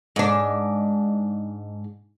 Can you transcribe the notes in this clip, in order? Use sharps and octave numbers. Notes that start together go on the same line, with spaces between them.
G#2 D4